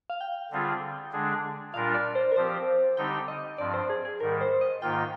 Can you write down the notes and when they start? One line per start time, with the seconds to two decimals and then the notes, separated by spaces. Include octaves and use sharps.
0.10 F5
0.21 G5
0.51 D3 G3 C4 F4 G#4
1.12 D3 G#3 D4 G#4
1.74 A#2 G3 D4 F4 A#4 F5
1.94 D5
2.15 C5
2.32 A#4
2.36 F3 C4 G4 C5
2.97 D3 G3 C4 D#4 G4 G5
3.28 D#5
3.58 G2 F3 C4 D5
3.74 C5
3.90 G#4
4.05 G#4
4.20 G#2 D#3 G3 A#4
4.41 C5
4.61 D#5
4.81 G#2 D#3 A#3 F4 G5